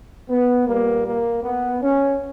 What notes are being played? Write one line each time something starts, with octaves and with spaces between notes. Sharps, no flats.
B3
A#2 G3 A#3
A#3
B3
C#4